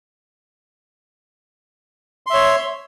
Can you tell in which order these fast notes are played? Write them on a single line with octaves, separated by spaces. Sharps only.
C6 E5 C#5